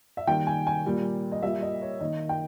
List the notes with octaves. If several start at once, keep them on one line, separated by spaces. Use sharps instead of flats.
E5
D#3 G3 A#3 G5
G#5
G#5
A#2 G3 A#3
D#5
A#2 G3 A#3 E5
D#5
C#5
D#3 A#3 D#5
G5